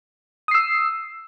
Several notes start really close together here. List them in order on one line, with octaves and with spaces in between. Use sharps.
D#6 C7 E6